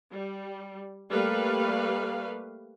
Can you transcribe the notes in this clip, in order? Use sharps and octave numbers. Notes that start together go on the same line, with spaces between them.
G3
G3 A3 A#3 B4 F5